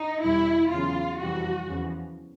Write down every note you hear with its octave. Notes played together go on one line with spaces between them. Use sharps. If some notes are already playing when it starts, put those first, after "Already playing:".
Already playing: D#4
E2 B2 G3 E4
E2 C#3 F#3 F4
F2 C3 E3 G3 F#4
E2 C#3 F3